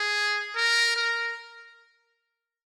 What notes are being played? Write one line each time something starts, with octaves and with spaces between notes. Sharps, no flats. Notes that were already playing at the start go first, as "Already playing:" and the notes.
Already playing: G#4
A#4
A#4